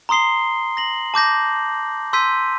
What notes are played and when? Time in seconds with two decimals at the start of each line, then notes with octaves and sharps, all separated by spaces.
0.09 A#5 C6 D#6 C7 G7
0.77 A#6 F#7
1.14 A5 D6 G6 A#6
2.13 C6 E6 G6 B6 D#7